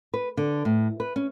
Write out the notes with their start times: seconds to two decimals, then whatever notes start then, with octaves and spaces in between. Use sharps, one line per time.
0.14 B4
0.37 D3
0.65 A2
1.00 B4
1.16 C#4